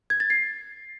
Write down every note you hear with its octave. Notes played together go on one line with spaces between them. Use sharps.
G#6
A6
C7